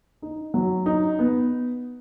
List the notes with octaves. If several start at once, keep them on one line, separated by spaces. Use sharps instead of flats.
D#4
F#3
D#4
B3